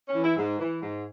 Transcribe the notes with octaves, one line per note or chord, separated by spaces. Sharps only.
C#4
E3
E4
G#2
E3
G#2